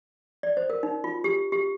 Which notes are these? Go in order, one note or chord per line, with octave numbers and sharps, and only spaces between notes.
D5
C5
A#4
D#4
F4
G4
G4